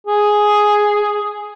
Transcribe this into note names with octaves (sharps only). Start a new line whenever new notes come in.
G#4